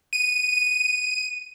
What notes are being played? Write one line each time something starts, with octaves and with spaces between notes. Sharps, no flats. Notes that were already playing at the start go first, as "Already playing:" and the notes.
D#7